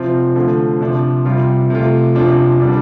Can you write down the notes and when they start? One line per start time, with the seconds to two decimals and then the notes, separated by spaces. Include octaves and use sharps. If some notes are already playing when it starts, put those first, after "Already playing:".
Already playing: C3 F3 C4 F4
0.36 D3 F3 A3
0.81 C3 F3 D4
1.25 C3 G3 F4
1.70 C3 A3 F4
2.15 C3 F3 D4 F4
2.60 D3 G3 D4